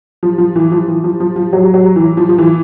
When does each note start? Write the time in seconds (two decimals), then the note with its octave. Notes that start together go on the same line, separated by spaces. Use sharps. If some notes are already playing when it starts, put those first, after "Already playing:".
0.23 F3
0.38 F3
0.56 E3
0.71 F3
0.88 E3
1.04 F3
1.20 F3
1.36 F3
1.53 F#3
1.74 F#3
1.96 E3
2.17 F3
2.29 F3
2.38 E3